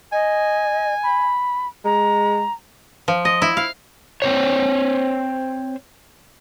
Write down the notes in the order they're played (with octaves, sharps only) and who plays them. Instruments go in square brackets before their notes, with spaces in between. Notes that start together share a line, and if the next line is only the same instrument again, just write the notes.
[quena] D#5 [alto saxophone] G#5
[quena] B5
[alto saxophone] G#3 [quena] A#5
[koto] F3
D#5
E4
F5
[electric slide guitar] C4 C5 C#5